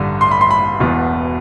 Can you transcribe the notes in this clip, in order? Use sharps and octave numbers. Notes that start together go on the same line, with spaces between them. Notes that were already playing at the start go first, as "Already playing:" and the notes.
Already playing: A1 G2 D3
C6
B5
C6
B5
E1 E2 B2